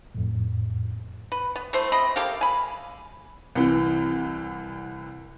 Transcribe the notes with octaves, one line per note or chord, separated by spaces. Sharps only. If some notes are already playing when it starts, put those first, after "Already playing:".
F2 A2
B4
B3
E3 A3 C5
C3 D#5 B5
A#3 G4 A4 F5
G#5 B5
C2 E3